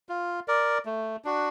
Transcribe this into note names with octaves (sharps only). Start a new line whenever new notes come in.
F4
A#4 D5
A3
D4 F#4